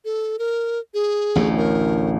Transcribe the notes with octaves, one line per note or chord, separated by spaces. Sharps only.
A4
A#4
G#4
A1 D2 A2
A#4